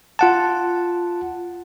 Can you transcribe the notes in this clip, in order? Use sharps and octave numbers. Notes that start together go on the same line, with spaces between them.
F4 F#5 A5